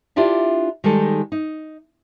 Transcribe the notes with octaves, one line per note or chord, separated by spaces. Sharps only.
D4 E4 F4 G4 D5 E5
D#3 G3 G#3 D#4 A4
D#4